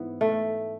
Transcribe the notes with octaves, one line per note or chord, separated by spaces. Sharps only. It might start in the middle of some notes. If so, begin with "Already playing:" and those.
Already playing: G#2 E3 B3
A3